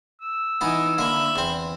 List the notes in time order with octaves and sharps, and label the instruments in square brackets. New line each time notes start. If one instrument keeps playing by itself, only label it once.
[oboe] E6
[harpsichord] E3 B3 [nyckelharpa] D#4 E4
[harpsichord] D3 A#3 [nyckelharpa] E5 B5
[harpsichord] E2 C4